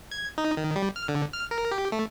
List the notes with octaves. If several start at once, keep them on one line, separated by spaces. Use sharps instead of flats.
G#6
D#4
D#3
G3
F6
D3
F6
A#4
G4
A3